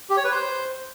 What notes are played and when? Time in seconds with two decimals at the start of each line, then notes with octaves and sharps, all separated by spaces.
0.10 G4
0.17 C#5
0.24 B4
0.32 C5